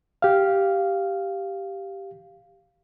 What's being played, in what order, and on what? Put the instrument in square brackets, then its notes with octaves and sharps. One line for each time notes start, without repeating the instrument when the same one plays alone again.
[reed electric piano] G4 F5